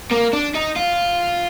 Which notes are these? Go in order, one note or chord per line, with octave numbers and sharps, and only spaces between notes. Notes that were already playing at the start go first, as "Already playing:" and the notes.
A#3
D4
D#4
F4